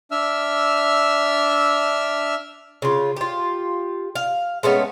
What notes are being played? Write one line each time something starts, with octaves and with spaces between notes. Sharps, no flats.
D4 E5 E6 F6
C#3 F4
F4 G4
F5
G#3 A3 B3 C#4